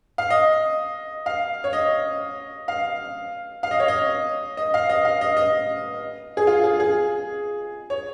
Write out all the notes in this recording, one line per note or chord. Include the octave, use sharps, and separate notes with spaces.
F5
D#5
F5
C#5
D#5
F5
F5
D#5
C#5
D#5
D#5
F5
D#5
F5
D#5
D#5
G#4
F4
G#4
G#4
C#5